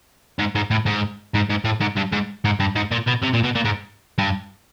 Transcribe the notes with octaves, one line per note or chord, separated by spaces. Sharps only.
G#2
G#2
A2
G#2
G#2
G#2
A2
G#2
G2
G#2
G#2
G2
G#2
A#2
B2
C3
A#2
B2
A#2
G#2
G2